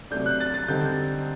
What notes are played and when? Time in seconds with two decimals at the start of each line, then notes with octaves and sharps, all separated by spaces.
0.11 C3 F#3 A3 D4 G6
0.26 F#6
0.40 A6
0.54 A6
0.68 D3 G3 C4 D#4 G6